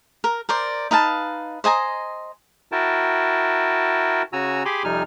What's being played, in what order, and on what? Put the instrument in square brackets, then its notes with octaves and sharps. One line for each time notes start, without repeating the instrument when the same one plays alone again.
[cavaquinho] A#4
A#4 C5 D5
D#4 B4 F5 A5
C5 D#5 G#5 A#5
[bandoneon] E4 F#4 A#4 G5 A5
C#3 F#4 G#5 A#5 E6
G4 G#4 G#5 B5 C6 D6
F2 C3 G3 D#4 G#5 F6